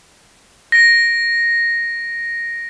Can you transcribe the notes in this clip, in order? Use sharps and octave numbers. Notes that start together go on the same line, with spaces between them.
A#6 D7